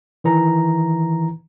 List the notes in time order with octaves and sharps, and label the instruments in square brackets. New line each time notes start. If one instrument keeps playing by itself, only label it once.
[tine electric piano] D#3 E3 A#5